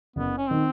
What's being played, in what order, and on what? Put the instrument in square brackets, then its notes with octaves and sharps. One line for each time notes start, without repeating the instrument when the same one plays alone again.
[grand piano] F#1 [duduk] B3
[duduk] C#4
[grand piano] D#3 [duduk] C4